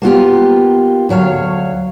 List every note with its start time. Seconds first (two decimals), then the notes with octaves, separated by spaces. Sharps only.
0.02 A#3 B3 F4 G4
1.09 D2 F#3 C#5 F5